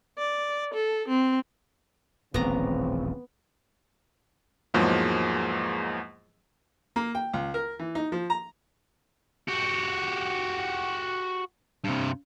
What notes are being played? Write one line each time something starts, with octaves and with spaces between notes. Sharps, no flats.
D5
A4
C4
D#1 A1 C#3 F3 B3 C4 A#5
E2 G#2 F3 F#3 G#3 A#3
A#3
G5
C#2
A#4
E3
D#4
F3
A#5
F#4 G4
G2 C3